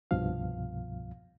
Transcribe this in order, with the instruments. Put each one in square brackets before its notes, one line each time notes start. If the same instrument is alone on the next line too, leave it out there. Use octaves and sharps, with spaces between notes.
[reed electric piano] C2 G2 B2 F3 F5